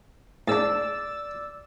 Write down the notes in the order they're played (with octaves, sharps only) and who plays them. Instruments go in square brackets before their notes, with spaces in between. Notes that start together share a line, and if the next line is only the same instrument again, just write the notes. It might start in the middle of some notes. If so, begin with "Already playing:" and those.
[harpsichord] G#2 D4 [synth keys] D5 E6 A6